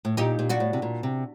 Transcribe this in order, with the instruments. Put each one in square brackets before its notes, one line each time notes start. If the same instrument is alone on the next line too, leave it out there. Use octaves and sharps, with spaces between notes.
[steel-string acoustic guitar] A2
[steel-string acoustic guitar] A#2 [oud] D#4 G4
[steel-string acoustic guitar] A#2
[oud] D4 F#4
[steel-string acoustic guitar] A2
C3
A#2
C3